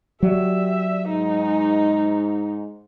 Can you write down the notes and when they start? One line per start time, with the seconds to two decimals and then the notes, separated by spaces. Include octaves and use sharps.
0.23 F#3 G4 D5 E5
1.09 G#2 D#4